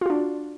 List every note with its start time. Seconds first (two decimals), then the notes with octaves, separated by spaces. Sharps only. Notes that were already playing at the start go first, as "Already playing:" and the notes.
0.01 F4
0.06 F#4
0.10 D4